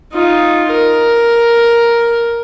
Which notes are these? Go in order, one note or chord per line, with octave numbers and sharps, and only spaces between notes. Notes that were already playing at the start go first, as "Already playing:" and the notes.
D#4 F4
A#4